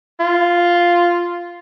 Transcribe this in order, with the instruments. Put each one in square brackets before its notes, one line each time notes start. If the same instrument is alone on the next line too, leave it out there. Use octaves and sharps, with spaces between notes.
[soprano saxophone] F4